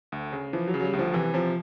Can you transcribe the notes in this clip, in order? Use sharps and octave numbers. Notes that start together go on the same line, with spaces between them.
D2
C#3
E3 F3
F#3
C#3
F#3
G3
D2
F3
C3 E3
C3 F3